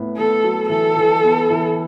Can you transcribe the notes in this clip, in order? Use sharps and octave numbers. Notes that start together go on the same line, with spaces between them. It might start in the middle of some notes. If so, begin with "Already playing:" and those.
Already playing: A2 B3
B3 A4
F#3
E3 A4
E3
B3
E3